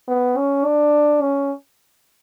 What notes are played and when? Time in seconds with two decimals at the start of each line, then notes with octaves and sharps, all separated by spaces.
0.08 B3
0.37 C#4
0.65 D4
1.22 C#4